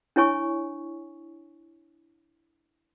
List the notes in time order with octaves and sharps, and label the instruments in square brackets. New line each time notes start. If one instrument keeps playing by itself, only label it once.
[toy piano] D4 E4 C#5 G#5 C#6